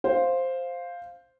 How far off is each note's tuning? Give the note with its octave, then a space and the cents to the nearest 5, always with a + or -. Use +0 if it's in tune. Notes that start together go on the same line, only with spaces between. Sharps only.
C5 +0 F5 +0